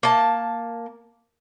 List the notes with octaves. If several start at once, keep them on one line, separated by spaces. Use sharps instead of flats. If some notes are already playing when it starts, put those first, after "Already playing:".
A#3 A5